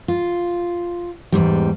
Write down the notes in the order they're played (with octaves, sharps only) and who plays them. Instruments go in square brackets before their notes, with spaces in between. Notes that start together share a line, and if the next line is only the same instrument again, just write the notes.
[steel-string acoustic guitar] F4
E2 G#2 G3